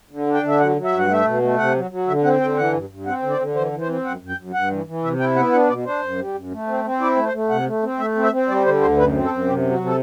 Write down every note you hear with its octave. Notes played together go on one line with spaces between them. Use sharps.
D3
D4
G5
D3 E5
F#3 F#5
F#3
E5
G2
F#5
A3 E5
B2
A3
C3 F#5
F#3
F#3
D3 E5
C4 F#5
D3 G5
E3 F#5
G2
G2
C4 F#5
D3
D5
D3
E3 C5
E3
C5
C4
F#2 F#5
F#2
G5
F#2
G2 F#5
E3
E3
C3 E5
E4 G5
B3 F#5
D4 F#5
B2 D5
D4 C5
F#2
G3
F#2
A3
C4
C4
E4 D5
A3
C5
A3
C3 F#5
A3
C4
A3 E5
C4
E5
C4
G3 D5
D3 C5
D2 C5
F#2 B4
C4
A4
F#2
C3 G4
F#3
F#4
C3
A4